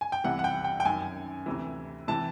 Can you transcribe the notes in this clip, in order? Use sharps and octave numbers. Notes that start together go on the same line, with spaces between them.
G#5
G5
C2 C3 E3 F#5
F#5
G5
G5
G5
F#2 D#3 G#5
D2 C3 E3
C3 E3 A5